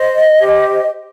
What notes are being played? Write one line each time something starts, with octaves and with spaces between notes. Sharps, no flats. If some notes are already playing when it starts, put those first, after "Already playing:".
Already playing: C5 D#5
G4 C5